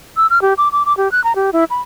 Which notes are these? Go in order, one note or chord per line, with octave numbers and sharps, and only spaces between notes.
E6
F6
G4
D6
D6
D6
G4
F#6
A#5
G4
E4
B5